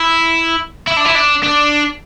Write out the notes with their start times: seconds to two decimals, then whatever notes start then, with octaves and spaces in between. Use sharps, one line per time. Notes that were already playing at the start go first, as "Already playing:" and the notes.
Already playing: E4
0.87 E4
0.97 D4
1.06 E4
1.16 D4
1.44 D4